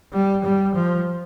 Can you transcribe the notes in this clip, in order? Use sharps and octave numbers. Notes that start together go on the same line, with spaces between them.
G3
G3
F3